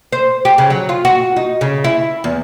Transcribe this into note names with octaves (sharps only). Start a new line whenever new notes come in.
C5
G4
C#3
F#3
F4
F#4
D#4
C#3
E4
E2